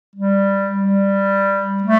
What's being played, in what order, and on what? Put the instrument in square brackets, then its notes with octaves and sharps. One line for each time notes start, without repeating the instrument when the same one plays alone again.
[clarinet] G3
G3
A3